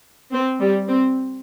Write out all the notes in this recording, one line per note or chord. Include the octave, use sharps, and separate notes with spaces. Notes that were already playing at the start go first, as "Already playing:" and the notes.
C4
G3
C4